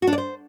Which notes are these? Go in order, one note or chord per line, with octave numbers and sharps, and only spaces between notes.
F#4
D4
D5
C5